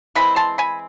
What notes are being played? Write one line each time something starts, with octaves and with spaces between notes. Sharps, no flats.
E3 G#3 C4 B5
A5 C6
G#5 B5